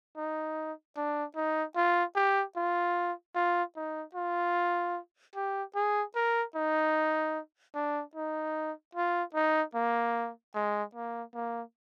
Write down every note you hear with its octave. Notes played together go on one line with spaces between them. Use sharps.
D#4
D4
D#4
F4
G4
F4
F4
D#4
F4
G4
G#4
A#4
D#4
D4
D#4
F4
D#4
A#3
G#3
A#3
A#3